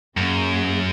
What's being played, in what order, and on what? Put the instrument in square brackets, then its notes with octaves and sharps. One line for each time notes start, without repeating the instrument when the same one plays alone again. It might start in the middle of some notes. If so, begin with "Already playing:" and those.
[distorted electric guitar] F#2 [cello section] F#3 A#3 C#4 G#4